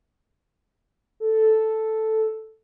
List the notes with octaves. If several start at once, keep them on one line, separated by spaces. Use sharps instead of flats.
A4